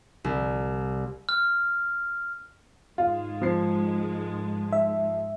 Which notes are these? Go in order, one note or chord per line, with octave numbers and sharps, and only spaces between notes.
C2
F6
G#2 D#3 G#3 F4
F3 C7
E5